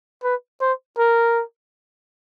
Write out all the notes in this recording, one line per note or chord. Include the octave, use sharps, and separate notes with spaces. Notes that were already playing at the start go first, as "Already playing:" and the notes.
B4
C5
A#4